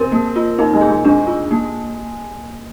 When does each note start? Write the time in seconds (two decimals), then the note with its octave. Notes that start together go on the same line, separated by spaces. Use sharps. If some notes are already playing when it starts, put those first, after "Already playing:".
Already playing: C4 A#4
0.12 A#3
0.36 F4
0.59 A#3 D#4
0.74 G#3
0.81 G#4
0.89 G#3
1.05 G#3 D4
1.27 F4
1.51 A#3